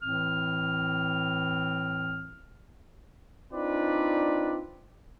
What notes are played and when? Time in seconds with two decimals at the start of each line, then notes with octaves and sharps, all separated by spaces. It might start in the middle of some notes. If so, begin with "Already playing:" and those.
0.03 A2 E3 C4 F6
3.53 C4 D4 D#4 F4 B4 D5